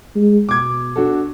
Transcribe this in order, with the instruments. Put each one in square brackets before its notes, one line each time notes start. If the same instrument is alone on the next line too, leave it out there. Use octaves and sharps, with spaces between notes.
[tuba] G#3
[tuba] B2 [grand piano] D6 G#6
[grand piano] D4 F#4 A4